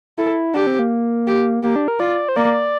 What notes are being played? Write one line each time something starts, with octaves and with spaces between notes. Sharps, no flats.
E4 A4
D4 G4
C4
A#3
G4
A#3 G4
D4
A#4
F4 D5
C5
A#3 D5